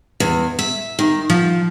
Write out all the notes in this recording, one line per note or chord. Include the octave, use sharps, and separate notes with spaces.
E2
E5
D#3
F3